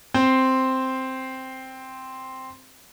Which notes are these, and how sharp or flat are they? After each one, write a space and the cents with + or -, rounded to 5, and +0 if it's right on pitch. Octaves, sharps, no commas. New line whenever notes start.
C4 +0 C5 +0